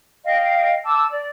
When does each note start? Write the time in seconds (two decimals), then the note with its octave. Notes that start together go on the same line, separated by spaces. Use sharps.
0.25 D#5 F5 G5
0.85 A5 D6 E6
1.10 D5